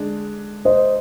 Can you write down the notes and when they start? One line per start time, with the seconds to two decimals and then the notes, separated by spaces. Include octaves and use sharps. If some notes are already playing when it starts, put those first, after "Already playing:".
Already playing: D3 G#3 D4
0.65 C5 D#5